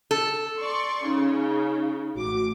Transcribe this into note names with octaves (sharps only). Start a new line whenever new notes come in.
A4
D5 C6 C#6
C#3 D#4
A1 A2 F#4 D6